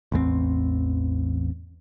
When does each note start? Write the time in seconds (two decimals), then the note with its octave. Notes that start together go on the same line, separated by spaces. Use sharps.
0.12 A1 E2 A3 C4